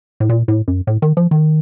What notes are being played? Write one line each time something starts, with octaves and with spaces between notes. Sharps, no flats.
A2
A#2
A2
F#2
A2
D#3
F3
D#3